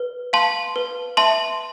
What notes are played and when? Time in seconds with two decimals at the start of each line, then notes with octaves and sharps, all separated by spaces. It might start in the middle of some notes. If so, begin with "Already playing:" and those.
Already playing: B4
0.33 F5 A5 C6
0.76 B4
1.17 E5 A5 C6